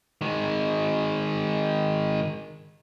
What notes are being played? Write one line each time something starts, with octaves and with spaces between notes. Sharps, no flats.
D#3 G#3